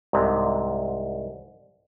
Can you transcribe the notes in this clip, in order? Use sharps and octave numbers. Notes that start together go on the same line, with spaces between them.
C2 G#2 C3